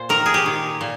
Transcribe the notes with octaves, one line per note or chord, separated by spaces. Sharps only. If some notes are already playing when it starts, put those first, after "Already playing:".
Already playing: A#2 C5
D#3 A#4
G#4
G4
D#3
A#2